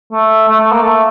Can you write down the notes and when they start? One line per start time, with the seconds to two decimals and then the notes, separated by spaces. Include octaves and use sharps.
0.12 A3
0.48 A3
0.60 A3
0.72 A#3
0.83 A3